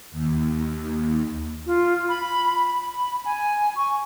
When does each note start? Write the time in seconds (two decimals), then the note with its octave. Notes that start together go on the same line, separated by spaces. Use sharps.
0.12 D#2
1.67 F4
2.09 B5
2.69 B5
3.25 G#5
3.76 C#6